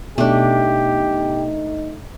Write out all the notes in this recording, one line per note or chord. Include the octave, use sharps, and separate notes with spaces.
B2 A3 D4 D#4 G4